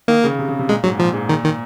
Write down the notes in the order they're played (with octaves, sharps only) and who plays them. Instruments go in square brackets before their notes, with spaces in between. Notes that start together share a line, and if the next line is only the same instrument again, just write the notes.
[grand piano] D#3 [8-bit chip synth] A#3
[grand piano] C#3
C3
C#3
C3
[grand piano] A#2 [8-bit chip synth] G#3
[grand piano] G#2 [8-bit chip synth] F#3
[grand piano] A#2 [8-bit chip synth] F3
[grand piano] G#2
[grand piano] A#2 [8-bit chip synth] D#3
[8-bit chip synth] D#3